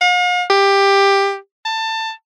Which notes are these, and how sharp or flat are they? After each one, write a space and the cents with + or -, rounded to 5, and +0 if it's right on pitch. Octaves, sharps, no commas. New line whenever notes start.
F5 +45
G4 +15
A5 +20